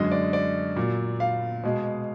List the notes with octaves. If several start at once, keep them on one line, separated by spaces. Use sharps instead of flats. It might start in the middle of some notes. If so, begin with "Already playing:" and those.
Already playing: F#2 D3 G#3 D#5
D5
D5
A#2 F#3
F5
B2 G#3